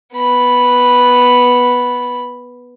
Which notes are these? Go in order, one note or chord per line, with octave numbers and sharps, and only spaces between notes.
B3 B5